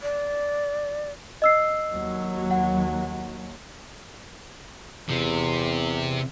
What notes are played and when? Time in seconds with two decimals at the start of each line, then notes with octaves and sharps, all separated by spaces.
0.03 D5
1.42 D#5 E6 C7
1.95 D#2 F#3
2.51 F#5
5.09 E2 C3